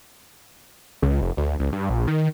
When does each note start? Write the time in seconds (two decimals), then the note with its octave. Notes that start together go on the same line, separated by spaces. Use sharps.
1.02 C#2
1.21 F1
1.37 D2
1.59 C#2
1.72 G2
1.89 A#1
2.07 D#3